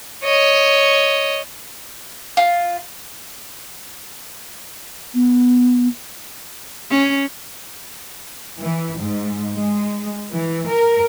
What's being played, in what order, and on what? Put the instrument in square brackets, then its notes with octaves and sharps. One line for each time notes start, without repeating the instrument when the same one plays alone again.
[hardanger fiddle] C#5 D#5
[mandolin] F4
[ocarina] B3
[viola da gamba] C#4
[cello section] E3
G#2
G#3
E3
A#4